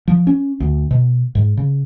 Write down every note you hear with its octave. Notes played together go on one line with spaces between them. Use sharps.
F3
C#4
D2
B2
G#2
C#3